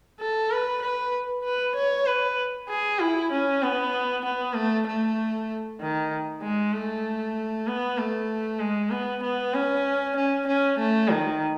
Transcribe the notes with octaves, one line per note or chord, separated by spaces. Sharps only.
A4
B4
B4
B4
C#5
B4
G#4
E4
C#4
B3
B3
A3
A3
D#3
G#3
A3
B3
A3
G#3
B3
B3
C#4
C#4
C#4
A3
D#3